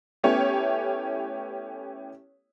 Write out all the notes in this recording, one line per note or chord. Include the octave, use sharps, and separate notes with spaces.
A3 B3 C#4 E4 G4 C#5